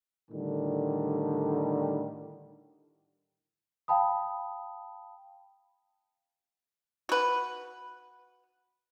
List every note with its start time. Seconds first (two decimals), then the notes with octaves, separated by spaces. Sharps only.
0.31 A2 D3 D#3 G3
3.88 F5 G5 A5 B5 D#6
7.09 F#4 B4